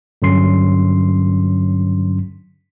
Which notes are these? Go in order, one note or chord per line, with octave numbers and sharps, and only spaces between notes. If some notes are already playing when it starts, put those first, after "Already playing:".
G2 D3 F#3 C#4 C6 C7